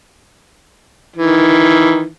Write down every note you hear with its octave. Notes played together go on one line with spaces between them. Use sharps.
D#3 E3